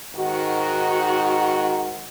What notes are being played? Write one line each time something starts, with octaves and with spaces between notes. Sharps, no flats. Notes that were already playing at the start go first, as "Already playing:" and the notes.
G#2 D#3 F#4